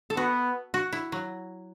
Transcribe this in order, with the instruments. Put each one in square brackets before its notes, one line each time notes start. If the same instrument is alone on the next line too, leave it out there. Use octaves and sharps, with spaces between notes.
[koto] A4
[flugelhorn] B3 [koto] F#4
[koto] F#4
E4
F#3